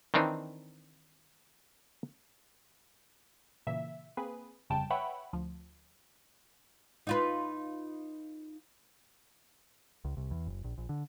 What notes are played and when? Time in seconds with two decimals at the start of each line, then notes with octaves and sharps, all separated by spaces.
0.14 D#3 E3 C4 D4 D#4
3.67 A#2 C#3 E3 A#3 E5
4.17 A#3 C4 G#4 B4
4.70 G1 F2 C#3 G3 G5 A5
4.91 B4 C#5 E5 F#5 G5 B5
5.33 D2 F3
7.07 D#4 F4 B4
10.05 C#2
10.17 C2
10.31 E2
10.47 F#1
10.64 A#1
10.78 A#1
10.89 D3